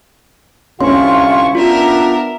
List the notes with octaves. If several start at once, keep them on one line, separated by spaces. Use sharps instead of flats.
C2 D3 C#4 E4 F4 C6 C#6
B3 D4 F4 A#4 E5